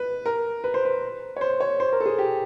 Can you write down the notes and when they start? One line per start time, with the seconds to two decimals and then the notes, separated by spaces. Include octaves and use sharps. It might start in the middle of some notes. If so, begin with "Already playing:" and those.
Already playing: B4
0.26 A#4
0.64 B4
0.74 C5
0.85 B4
1.36 C#5
1.41 C5
1.60 C#5
1.80 C5
1.92 A#4
2.00 A4
2.06 G#4
2.19 G4